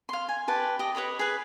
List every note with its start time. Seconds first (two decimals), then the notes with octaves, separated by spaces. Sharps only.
0.09 F5 C6
0.29 G#5
0.48 G4 B4 A5
0.79 G4 D#5
0.95 B4 C#5 D#5 B5
1.19 G#4 B4